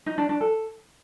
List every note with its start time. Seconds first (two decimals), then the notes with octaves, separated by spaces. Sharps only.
0.06 D#4
0.18 D4
0.29 D4
0.41 A4